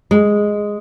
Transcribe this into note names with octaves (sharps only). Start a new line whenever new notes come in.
G#3